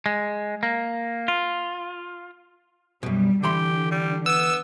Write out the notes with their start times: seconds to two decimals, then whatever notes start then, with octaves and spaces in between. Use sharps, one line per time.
0.06 G#3
0.63 A#3
1.28 F4
3.03 F#2 B2 G3
3.43 D3 E3 G4 B5 C6
3.91 G3
4.26 B3 E6